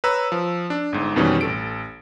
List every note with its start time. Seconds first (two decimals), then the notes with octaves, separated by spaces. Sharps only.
0.04 B4 C#5 A#5 E6
0.32 F3
0.70 D4
0.93 G1 G#2
1.16 F2 B2 D#3 E3 G3 C#4
1.41 A1 A4 D7